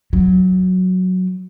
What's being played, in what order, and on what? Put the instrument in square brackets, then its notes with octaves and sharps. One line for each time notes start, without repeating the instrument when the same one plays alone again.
[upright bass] F#3